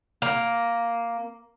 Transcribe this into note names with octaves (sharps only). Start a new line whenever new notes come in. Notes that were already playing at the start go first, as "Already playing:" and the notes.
A#3